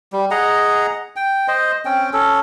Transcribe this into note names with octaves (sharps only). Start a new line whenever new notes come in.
G3
G#4 D#5 F#5 A#5
G5
C5 D#5
C4 C#4 G5
C#4 A4